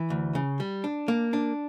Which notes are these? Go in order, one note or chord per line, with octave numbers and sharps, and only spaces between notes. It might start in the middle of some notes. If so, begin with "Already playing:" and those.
Already playing: E3
D2
C#3
G3
D4
A#3
D4